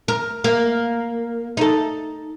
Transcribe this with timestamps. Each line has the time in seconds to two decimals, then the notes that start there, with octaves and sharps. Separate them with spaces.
0.08 A#4
0.44 A#3
1.57 D#4 A4